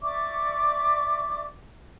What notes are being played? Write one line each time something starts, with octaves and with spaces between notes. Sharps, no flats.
D5 E5 C#6 D6